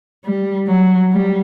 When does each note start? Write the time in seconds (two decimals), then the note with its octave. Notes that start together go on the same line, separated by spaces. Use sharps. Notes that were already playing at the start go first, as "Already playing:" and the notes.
0.24 G3
0.68 F#3
1.13 G3